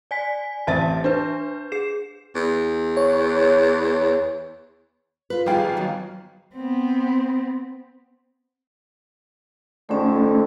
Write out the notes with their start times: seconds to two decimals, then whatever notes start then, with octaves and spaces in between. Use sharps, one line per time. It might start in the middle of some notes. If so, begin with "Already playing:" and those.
0.11 D5 G#5 B6
0.67 A1 C4 E5 A5 A6
1.04 D4 B4 C5
1.72 G#4 C7 E7
2.36 E2
2.97 C#5
5.30 F4 B4
5.46 G#1 F3 G3 F4 G#4 G5
5.77 D#3 F#3 B3
6.56 B3 C4
9.89 F2 G#2 D3 A3 C#4